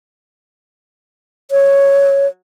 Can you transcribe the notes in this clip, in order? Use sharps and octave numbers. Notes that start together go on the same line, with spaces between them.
C#5